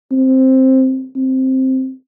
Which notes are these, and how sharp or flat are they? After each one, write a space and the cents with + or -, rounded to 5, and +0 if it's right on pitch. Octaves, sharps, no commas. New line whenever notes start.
C4 +5
C4 +5